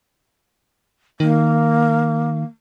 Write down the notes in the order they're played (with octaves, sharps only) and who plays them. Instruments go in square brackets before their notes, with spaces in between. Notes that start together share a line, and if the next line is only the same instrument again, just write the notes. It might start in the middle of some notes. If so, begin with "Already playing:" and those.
[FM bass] D#3 [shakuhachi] A#3